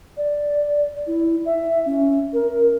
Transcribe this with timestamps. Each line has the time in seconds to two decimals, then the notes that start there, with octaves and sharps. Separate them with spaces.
0.17 D5
1.07 E4
1.46 E5
1.86 C#4
2.33 A#4